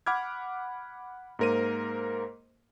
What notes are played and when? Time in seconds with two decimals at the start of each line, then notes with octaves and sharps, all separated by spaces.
0.06 F#5 B5 D6 F6 G#6
1.39 G#2 A#3 A#4 C5 D#7